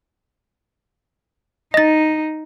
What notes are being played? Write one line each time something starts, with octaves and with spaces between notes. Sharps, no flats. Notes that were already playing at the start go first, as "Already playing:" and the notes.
D#4 D#5 A6